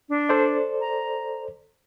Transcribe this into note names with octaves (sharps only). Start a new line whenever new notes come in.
D4
A4 C5 D5
A#5